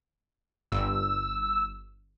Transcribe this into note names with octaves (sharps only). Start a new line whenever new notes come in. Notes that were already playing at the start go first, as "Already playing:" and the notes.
G1 E6